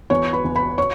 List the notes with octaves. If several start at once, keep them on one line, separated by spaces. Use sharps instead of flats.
E2 C#5 C#6
B4 B5
E2
B4 B5
C#5 C#6